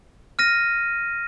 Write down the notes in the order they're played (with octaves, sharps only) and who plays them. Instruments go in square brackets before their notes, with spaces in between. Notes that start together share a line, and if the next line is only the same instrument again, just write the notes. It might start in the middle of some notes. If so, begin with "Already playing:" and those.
[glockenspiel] F6 A#6 D#7